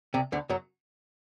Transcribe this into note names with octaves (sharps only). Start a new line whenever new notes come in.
C2 C3
D2 D3
F#2 F#3